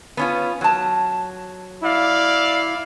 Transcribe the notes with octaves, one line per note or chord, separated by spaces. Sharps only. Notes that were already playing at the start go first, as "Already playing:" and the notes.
B3 C#4 F4
F#3 A5
E4 D5 F5